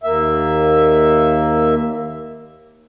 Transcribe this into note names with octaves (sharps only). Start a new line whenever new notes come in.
D#2 A#3 E5